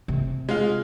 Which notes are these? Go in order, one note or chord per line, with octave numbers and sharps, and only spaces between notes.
C3
G#3 F4